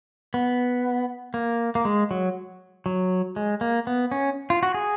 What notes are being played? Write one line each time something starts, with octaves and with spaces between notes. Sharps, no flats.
B3
A#3
A#3
G#3
F#3
F#3
G#3
A#3
B3
C#4
F4
F#4
G#4